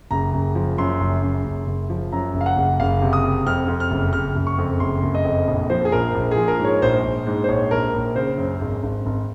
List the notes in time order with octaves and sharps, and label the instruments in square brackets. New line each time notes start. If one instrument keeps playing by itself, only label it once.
[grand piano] F#1 A#5
F#1
F3
F#2 C6
F#1
F#2
F#1
F#1
F3
F#2 A#5
F#1
F5
F#5
F#1
F#1 F5
C3
D#6
C3
F2 F6
F2
F6
F#1
F#1 F6
F#1
C#6
F2
F#1 C6
F#1
D#5
F2
A#1
F3 C5
G#4
A#1 A#4
A#1
G#4
F3
A#4
G#2
C#5
A#1 C5
A#1
G#2
C5
A#1 C#5
A#1 A#4
A#1
C#3 C5
F#2
G#1
G#1
G#1